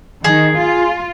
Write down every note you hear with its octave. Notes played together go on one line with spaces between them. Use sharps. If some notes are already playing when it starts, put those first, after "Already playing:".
D#3 G#4
F4